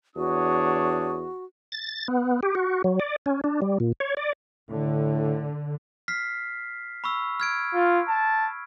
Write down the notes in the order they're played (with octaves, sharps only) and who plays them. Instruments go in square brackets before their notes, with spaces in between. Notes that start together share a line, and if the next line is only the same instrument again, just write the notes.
[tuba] E2 [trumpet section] D4 C#5 D#6 [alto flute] F#4
[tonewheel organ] A6
B3
G4
F#4
F#3
D5
C#4
D4
G3
A#2
C#5
D5
[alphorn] A2 [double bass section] D3
[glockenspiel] F6 B6 C7
B5 C#6 E6
F6 G#6 D7
[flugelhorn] F4
A5